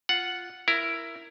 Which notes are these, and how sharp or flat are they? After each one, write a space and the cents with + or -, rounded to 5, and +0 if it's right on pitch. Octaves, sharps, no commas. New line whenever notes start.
F4 +0 F#5 +0
E4 +10 A#4 +0